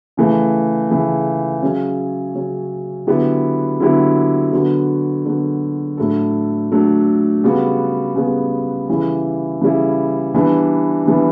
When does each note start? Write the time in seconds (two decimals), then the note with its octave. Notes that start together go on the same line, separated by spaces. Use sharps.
0.17 C#3 E3 A3
0.90 C#3 E3 A3
1.62 C#3 F#3 C#4
2.35 C#3 F#3 C#4
3.07 D3 F#3 B3 E4 G4
3.80 D3 F#3 B3 E4 G4
4.52 D3 F#3 B3 F#4
5.25 D3 F#3 B3 F#4
5.97 A2 F#3 A3 D4 A4
6.70 A2 F#3 A3 D4 A4
7.44 C#3 G3 B3 F#4
8.16 C#3 G3 B3 F#4
8.88 C#3 E3 G3 C#4 E4
9.61 C#3 E3 G3 C#4 E4
10.34 E3 G3 B3 D4
11.06 E3 G3 B3 D4